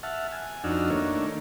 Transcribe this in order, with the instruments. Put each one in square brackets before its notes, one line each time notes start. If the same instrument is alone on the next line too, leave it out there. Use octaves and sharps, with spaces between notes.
[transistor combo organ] E5 F#5 A5 F6
G#5
F2 D4 D#4 F#4 E6 F6
D#3 A3 A#3 D4 C#5